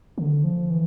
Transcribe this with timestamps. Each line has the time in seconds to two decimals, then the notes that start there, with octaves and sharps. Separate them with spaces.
0.18 D3
0.44 F3
0.70 E3